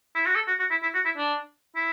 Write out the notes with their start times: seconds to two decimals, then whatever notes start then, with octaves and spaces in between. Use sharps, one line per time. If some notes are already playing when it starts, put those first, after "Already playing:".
0.15 E4
0.26 F#4
0.36 A4
0.48 F#4
0.60 F#4
0.71 E4
0.83 E4
0.95 F#4
1.05 E4
1.17 D4
1.76 E4